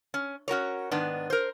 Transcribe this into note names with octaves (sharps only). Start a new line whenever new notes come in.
C#4
C#4 F#4 A#4 C#5
G#2 D#3 B3 D4
A#4 C5